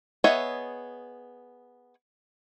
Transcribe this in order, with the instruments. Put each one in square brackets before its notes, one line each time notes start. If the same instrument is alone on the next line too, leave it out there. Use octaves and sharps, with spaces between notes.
[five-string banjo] B3 G#4 C#5 D#5 E5